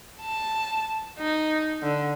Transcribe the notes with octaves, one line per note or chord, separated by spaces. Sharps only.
A5
D#4
D3